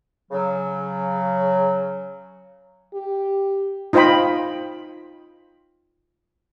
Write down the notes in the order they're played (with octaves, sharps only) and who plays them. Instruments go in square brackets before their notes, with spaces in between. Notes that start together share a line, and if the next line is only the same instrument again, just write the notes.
[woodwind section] C#3 F#3
[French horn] G4
[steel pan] D#4 F4 C5 D#5 G5 B5